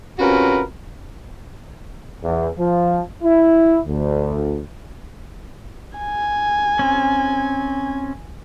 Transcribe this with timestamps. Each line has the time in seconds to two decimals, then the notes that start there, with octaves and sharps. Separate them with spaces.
0.18 C3 C#4 F4 F#4 A#4 B4
2.23 E2
2.59 F3
3.23 E4
3.86 D2
5.98 G#5
6.79 C4 C#4